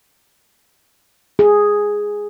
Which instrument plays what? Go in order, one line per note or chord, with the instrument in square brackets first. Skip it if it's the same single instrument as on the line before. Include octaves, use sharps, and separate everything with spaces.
[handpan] G#4